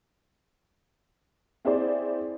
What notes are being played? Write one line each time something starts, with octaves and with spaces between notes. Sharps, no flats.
C4 E4 G#4 C5 D5